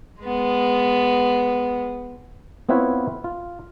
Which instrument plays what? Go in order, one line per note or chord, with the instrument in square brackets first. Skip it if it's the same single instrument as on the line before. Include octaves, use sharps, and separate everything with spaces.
[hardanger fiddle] G#3 B3
[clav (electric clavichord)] B3 C4 E4 F4 B4 C#5
F4